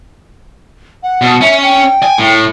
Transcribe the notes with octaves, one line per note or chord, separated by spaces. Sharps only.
F#5
B2
C#4 E5
G5
G#5
A2